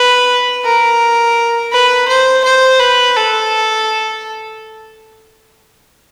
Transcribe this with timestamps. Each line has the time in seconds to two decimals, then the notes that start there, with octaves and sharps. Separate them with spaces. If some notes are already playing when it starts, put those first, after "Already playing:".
Already playing: B4
0.65 A#4
1.72 B4
2.08 C5
2.44 C5
2.80 B4
3.16 A4